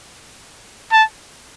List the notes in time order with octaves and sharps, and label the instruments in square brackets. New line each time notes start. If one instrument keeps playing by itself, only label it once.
[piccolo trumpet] A5